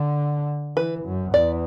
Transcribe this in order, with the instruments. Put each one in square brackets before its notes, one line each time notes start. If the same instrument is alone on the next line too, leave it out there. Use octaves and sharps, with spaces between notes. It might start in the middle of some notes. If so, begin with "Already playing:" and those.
Already playing: [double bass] D3
[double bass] E3 [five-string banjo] B4
[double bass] F#2
[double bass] E2 [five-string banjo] D5